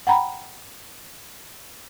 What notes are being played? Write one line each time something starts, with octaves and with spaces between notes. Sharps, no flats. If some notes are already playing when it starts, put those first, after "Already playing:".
F#5 G5 A#5 B5